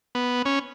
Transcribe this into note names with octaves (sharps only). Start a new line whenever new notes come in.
B3
C#4